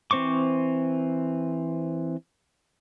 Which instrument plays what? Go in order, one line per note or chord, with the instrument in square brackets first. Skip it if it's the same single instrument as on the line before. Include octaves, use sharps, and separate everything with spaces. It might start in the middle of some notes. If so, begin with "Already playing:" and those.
[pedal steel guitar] E3 C4 C5 C#6 D6